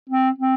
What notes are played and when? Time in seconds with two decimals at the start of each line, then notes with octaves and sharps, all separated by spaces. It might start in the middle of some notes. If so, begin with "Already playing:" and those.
0.10 C4
0.38 C4